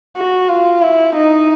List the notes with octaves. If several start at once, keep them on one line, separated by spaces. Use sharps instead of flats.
F#4
F4
E4
D#4